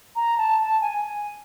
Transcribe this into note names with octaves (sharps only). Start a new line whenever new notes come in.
A#5
A5
A5
G#5